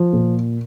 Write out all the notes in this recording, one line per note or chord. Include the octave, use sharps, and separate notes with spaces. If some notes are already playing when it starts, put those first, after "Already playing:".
Already playing: F3
A#2